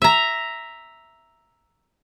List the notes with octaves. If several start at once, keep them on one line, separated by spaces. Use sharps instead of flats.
E5 A#5